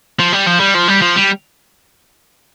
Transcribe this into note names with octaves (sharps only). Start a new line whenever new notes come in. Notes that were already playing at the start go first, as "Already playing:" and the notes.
F3
G3
F3
G3
F3
G3
F3
G3